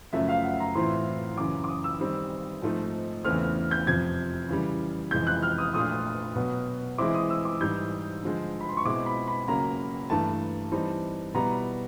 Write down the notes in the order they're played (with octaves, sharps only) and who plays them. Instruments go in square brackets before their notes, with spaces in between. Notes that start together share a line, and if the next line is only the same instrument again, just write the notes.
[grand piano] F#2 C#3 F3 A3 [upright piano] E5
[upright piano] F5
F#5
A#5
[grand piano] A2 E3 A3 C4 F4 [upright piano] C6
[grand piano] F#2 C#3 E3 [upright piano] D6
[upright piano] D6
D#6
E6
[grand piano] D#3 G3 C4
G#2 F3 A3 C4 D#4
[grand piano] E2 C#3 E3 A3 C4 [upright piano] F6
[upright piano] G6
[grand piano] F2 C3 F3 [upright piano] G#6
[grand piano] C#3 E3 G3
[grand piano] F2 C3 E3 G#3 [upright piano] G6
[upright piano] F#6
F6
D#6
[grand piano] A#2 F3 A3 D4 F4 [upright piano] D#6
[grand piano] B2 F#3 B3
[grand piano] E3 G#3 C4 E4 [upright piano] D6
[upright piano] D#6
E6
D6
[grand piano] G#2 E3 G3 [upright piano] G6
[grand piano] D3 F3 G#3
[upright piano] B5
C6
C#6
[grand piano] B2 G#3 C4 E4 [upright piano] D6
[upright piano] B5
B5
[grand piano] C#3 F#3 A#3 [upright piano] A#5
[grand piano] G2 E3 A3 [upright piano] A5
[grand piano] E3 G3 C4 D#4
[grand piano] B2 G3 B3 E4 [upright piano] A#5